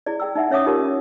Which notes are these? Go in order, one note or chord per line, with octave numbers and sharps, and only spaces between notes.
E4 G#4 D5
G#4 G5 E6
D#4 E5 F#5
C#4 C#5 E5 F5 D6 D#6
D#4 F4 G4 A#4
C#4